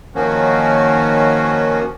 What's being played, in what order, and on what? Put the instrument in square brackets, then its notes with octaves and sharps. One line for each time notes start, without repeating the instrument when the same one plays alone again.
[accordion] D#3 F3 A#3 C#4 F#4